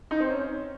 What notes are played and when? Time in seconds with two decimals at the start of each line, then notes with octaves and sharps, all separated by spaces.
0.11 D#4
0.20 C4
0.30 C#4